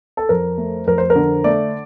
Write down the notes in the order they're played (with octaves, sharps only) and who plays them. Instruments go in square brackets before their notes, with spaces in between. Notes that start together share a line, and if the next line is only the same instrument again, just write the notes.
[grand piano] A4
F2 A#4
A3
F2 A#4
C5
A#4
D3
A3 D5